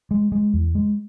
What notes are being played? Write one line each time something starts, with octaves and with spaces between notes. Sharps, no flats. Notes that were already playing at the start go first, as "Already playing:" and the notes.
G#3
G#3
E2
G#3